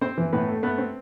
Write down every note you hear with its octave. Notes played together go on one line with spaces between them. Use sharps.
C4 C5
E3
A2 B3 B4
A3
A3 B3 B4
C4